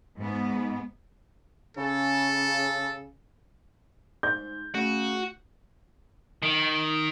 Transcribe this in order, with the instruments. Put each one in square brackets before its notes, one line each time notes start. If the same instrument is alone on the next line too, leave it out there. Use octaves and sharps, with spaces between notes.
[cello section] G#2 B3
[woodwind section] C#3 [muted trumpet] A4
[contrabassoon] G#2 [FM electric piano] C5 [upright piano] G6
[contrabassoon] C#3 [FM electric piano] A3 [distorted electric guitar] F#4
[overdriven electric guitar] D#3